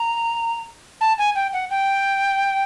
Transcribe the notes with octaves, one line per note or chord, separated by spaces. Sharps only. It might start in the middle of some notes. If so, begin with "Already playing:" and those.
Already playing: A#5
A5
G#5
G5
F#5
G5